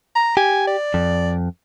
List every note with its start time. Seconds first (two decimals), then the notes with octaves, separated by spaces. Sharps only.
0.15 A#5
0.37 G4 G#5
0.67 D5
0.94 F2